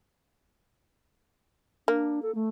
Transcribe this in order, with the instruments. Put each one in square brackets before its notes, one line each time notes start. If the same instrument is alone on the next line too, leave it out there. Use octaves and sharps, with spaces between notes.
[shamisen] A#3 [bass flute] D4
[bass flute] A4
A3